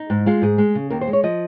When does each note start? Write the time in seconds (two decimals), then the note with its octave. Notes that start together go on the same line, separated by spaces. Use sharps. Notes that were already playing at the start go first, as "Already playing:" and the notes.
Already playing: D#4
0.10 G#2
0.26 G#3 F4
0.42 G#2 G#4
0.58 G#3
0.75 C#3
0.90 D#2 A#4
1.01 C5
1.07 G#3
1.13 C#5
1.24 F3 D#5